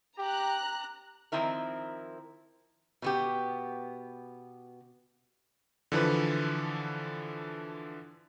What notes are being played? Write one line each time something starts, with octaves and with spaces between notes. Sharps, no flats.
G4 A#5 F#6
D#3 F3 C4 E4 A#4
B2 B3 G4
D3 E3 F3 B4